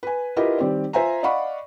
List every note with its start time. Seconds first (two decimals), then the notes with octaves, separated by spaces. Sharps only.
0.03 B4 G#5
0.36 E4 F4 G4 A#4 B4 D#5
0.58 D#3 G3 C4 G4 D5
0.93 F4 C5 E5 G#5 A#5
1.23 D5 D#5 F5 F#5 B5 C#6